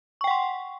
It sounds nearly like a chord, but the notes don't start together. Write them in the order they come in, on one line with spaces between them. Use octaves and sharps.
C#6 G5 F#5 C6